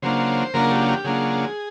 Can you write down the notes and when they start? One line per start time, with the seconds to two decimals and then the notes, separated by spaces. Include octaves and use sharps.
0.02 C#3 F#3 A#3 D4 F4 C5
0.54 C#3 F#3 A#3 D4 F4 A#4
0.71 G4
0.88 G4
1.04 C#3 F#3 A#3 D4 F4 G#4